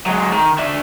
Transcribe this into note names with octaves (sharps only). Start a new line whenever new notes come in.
F#3 G#3
D#3
D4 E5